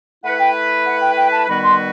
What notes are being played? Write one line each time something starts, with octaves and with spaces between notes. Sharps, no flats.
A3 E4 B4 F#5
G5
F#5
G5
G5
A5
D#3 G3 B3 F#4 B4 B5
C6